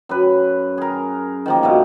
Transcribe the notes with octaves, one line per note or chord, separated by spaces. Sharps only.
F#2 B4
G#4 A#4
D#3 F3 A#3
G2 B2 A3